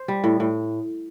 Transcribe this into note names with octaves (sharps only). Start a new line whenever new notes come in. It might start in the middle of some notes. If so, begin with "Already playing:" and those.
Already playing: C5
G3
A2
A2